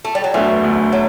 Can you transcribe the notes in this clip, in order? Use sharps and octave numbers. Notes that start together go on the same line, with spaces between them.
A3
G3
F#3
E1 D2 D3 E3 F#3 A3
E1 D2 D3 F#3 A3
F#3